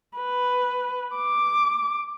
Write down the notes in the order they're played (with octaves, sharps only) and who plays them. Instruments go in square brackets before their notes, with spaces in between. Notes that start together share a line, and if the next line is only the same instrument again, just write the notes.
[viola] B4
D6